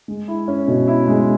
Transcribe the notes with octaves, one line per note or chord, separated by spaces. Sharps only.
G#3
E4
C#4
B2
E4
G#3